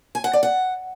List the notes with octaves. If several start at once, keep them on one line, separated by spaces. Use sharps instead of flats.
G#5
F#5
D5
F#5